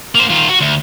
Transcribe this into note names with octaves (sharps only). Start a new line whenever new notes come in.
A#3 C5
D#3 F4
F#4
D2